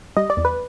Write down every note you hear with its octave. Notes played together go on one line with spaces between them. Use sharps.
G3 D#5
D5
E2
B4